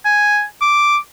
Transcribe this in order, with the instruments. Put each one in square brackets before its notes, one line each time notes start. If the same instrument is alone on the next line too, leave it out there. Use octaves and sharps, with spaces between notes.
[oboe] G#5
D6